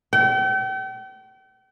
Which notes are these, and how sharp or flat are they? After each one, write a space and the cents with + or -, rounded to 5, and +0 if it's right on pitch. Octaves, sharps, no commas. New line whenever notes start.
G5 -40